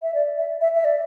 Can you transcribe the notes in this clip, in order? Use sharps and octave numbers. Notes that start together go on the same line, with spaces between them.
E5
D5
E5
E5
E5
D5